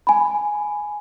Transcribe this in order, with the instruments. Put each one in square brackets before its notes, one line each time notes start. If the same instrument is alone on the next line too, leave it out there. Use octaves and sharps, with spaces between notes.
[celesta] G#5 B5